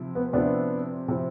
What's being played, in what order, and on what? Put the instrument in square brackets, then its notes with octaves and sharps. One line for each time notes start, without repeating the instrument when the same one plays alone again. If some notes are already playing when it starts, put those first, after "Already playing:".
Already playing: [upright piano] C3 F3 C4 E4
[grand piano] B3
[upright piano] C3 F3 C4 E4 [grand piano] B3 D4
[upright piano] C3 F3 C4 E4